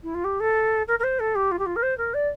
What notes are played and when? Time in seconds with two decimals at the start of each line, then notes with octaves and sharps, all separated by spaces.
0.03 E4
0.14 F4
0.24 G4
0.40 A4
0.88 A#4
0.99 A#4
1.03 C5
1.19 A4
1.35 G4
1.51 F4
1.59 G4
1.66 F4
1.76 A#4
1.82 C5
1.97 A#4
2.14 D5